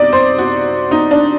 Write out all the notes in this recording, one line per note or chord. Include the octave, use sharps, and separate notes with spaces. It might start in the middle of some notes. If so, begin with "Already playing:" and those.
Already playing: C3 D#4 D5
C5
F#4
D#4
D4